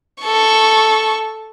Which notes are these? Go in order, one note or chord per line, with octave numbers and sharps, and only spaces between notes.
A4 C#6